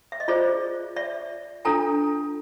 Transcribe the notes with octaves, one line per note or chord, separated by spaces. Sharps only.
E5
D#5
F4 G#4 C5 D5
D5 E5
D4 F4 A4 G#5 A#5